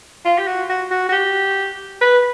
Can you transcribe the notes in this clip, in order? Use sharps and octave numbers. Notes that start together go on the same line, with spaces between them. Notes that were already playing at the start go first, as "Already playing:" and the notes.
F4
G4
F#4
F#4
F#4
F#4
G4
B4